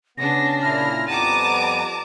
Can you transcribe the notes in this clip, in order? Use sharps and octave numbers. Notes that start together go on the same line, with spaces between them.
C#3 B3 D4 A#6
A#2 E4 F6
F2 G3 B3 A5 A#5 D6 D#7